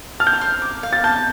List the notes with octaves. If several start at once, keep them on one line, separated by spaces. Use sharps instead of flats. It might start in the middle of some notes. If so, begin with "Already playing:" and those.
A5 F6
G6
F6
C5
D6
F5
A6
A5 G6